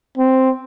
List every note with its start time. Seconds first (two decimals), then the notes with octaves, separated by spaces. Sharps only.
0.18 C4